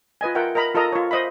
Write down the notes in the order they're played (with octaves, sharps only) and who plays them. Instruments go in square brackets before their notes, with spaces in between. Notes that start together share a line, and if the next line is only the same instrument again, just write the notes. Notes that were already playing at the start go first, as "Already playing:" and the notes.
[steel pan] F4 B4 D#5 G#5
F4 A#4 E5 F#5 G5
A#4 D#5 A#5 B5
F4 A4 A#4 D#5 A#5 D#6
F4 C#5
C5 D#5 E5 B5